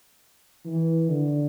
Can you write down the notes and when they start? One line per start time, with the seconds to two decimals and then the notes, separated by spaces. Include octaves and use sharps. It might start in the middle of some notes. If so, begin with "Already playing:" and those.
0.65 E3
1.09 D3